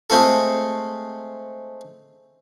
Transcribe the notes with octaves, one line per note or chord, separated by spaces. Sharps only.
G#3 A3 C4 F4 A4